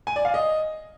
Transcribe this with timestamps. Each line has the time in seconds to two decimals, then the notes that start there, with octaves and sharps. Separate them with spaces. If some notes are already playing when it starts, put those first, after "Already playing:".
0.07 G#5
0.16 D5
0.25 F5
0.34 D#5